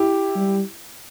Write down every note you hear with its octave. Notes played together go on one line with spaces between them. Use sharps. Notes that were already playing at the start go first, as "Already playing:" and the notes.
Already playing: E4 G4
G3